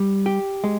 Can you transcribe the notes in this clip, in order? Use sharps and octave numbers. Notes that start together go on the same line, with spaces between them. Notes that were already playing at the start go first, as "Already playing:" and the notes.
Already playing: G3
G4
G#3